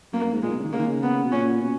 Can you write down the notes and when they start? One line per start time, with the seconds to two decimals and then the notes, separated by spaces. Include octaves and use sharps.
0.12 F#2 A#3
0.23 F#2
0.32 G#2
0.43 A#2 G#3
0.52 B2
0.58 C#3
0.63 D#3
0.73 C#3 A#3
0.79 D#3
0.87 C#3
1.03 B3
1.24 B2
1.32 A#2 C#4
1.62 B2